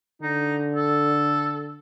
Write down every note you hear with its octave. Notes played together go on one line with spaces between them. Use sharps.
D3 D#4
A4